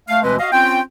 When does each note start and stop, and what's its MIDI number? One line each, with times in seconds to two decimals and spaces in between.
0.08 0.22 57
0.08 0.22 77
0.23 0.36 38
0.23 0.36 47
0.23 0.36 52
0.23 0.36 56
0.23 0.36 60
0.23 0.36 71
0.39 0.49 66
0.39 0.49 75
0.39 0.49 77
0.52 0.79 60
0.52 0.79 61
0.52 0.79 65
0.52 0.79 79